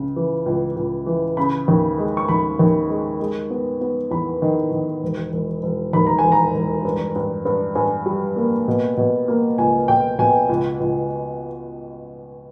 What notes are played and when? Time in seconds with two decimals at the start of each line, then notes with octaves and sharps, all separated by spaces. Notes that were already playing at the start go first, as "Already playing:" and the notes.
Already playing: C#2 C#3
0.16 E3
0.46 C#2
0.76 C#2
1.06 E3
1.37 C#3 B5
1.68 D#2
1.98 G#3
2.17 C#6
2.28 D#2 B5
2.59 D#2
2.90 G#3
3.20 G#3
3.50 B3
3.81 B3
4.11 E2 B5
4.42 D#3
4.71 D#3
5.03 E1
5.33 E1
5.63 E1
5.93 D#2 B5
6.07 A#5
6.19 G#5
6.24 E1
6.32 A#5
6.54 E1
6.85 G2
7.15 G2
7.45 G2
7.75 G2 G#5
8.06 G3
8.36 A#3
8.68 B2
8.97 B2
9.28 A#3
9.58 C#2 G#5
9.88 B2 G5
10.19 B2 G#5
10.49 C#2
10.80 C#2